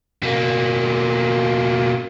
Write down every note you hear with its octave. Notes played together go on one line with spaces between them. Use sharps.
B2 A#3